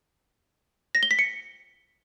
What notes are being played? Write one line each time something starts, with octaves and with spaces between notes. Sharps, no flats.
A#6
G7
B6
C#7